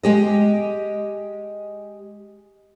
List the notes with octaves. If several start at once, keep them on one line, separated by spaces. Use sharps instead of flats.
G#3 G4 D#5